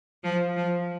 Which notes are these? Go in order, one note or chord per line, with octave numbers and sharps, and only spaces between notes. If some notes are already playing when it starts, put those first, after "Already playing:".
F3
F3